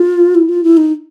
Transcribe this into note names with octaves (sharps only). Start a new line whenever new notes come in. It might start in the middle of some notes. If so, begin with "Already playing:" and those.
Already playing: F4
E4
F4
E4
D#4